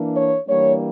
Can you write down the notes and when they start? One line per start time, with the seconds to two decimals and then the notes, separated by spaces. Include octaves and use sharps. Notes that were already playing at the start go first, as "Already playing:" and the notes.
Already playing: E3 A#3 D4
0.15 C#5
0.48 E3 G3 A#3 D4 C#5